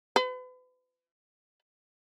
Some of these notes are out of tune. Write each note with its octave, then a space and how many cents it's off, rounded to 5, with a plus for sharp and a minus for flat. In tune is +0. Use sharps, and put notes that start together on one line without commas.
B4 +40